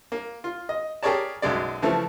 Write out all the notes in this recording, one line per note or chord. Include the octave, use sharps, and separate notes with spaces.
A#3
F4
D#5
G4 G#4 A#4 C#5 D5 A5
B1 F#2 G#3 D5
C#3 E3 F3 A3